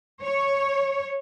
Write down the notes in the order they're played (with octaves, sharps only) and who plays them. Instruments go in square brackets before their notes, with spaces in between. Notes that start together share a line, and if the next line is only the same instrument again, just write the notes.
[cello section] C#5